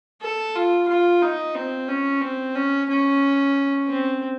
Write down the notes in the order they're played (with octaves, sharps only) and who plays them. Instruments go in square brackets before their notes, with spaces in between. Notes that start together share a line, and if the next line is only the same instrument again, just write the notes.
[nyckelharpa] A4
F4
F4
D#4
C4
C#4
C4
C#4
C#4
C4